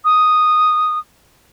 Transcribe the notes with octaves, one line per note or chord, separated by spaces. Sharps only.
D#6